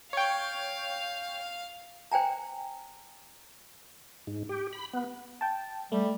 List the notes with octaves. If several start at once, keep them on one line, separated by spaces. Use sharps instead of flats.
C#5 F5 G5
C5 G5 G#5 A#5
G#2
G4
B5
B3
G5 A5
G3 A3